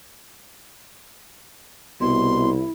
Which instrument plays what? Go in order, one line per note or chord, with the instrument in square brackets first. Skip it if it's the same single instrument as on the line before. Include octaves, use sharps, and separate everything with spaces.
[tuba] C2 [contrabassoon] B2 [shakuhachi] E4 [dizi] C6